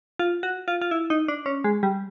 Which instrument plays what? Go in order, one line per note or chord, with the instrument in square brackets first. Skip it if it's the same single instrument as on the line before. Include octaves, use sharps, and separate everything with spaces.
[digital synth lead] F4
F#4
F4
F4
E4
D#4
D4
C#4
G#3
G3